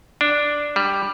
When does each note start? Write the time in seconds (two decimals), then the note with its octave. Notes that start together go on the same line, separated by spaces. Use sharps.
0.21 D4
0.76 G3